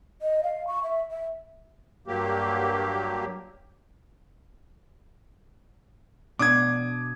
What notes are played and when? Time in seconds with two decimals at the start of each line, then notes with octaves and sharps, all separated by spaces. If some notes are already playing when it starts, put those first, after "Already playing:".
0.22 D#5
0.43 F5
0.67 C#6
0.83 E5
1.11 E5
2.07 G2 F#3 A#3 G4
6.39 B2 D4 D6 D#6 G#6